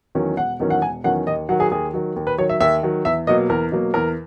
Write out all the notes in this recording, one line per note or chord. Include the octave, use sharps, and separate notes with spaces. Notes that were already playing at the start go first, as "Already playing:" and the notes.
E2 D#3 F#3 C#4
E1 F#5
E2 D#3 F#3 C#4
F#5
E1 G#5
E2 D#3 F#3 C#4 F#5
D#2 D#5
D#3 F#3 F#5
G#4
D#2 G#4
D#3 F#3
D#2
B4
D#3 F#3 C#5
E5
D#2 E5
D#3 F#3
E2 E5
B2 F#3 A#3 D#5
E2 A#4
B2 F#3 A#3
E2 A#4